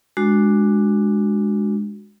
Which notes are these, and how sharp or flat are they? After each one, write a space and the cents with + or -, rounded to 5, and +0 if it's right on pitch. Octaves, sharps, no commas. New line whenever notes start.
G#3 +0 D4 +5 F#4 -5